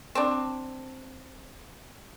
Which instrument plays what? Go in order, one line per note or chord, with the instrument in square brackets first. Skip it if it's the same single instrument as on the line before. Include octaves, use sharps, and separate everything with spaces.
[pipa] C4 D4